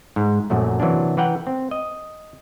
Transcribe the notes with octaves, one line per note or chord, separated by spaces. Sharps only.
G#2
A#1 F#2 A#2 F#3 A3
C3 E3 F#3 A#3 C#4 D4
E3 B4 F#5 G5 A#5
C4
D#5